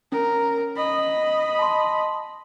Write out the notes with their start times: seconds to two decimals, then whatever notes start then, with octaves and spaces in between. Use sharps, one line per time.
0.12 C#4 A#4
0.76 D#5 B5
1.59 A5 C6